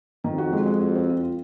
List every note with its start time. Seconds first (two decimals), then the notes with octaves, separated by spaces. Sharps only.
0.24 F2 D#3
0.38 F#4
0.53 G#3
0.66 G#3
0.81 F#4
0.95 C4
1.10 F4
1.24 F4